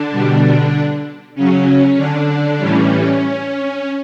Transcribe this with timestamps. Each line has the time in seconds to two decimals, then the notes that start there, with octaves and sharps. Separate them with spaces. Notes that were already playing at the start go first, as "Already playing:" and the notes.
Already playing: D3 D4
0.12 B2 G3
1.35 C#3 F#3 C#4
1.96 D3 D4
2.58 A2 E3 G3 C#4